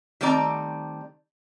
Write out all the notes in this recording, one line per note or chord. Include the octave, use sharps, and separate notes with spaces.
D#3 G3 A3 C4 D5 A#5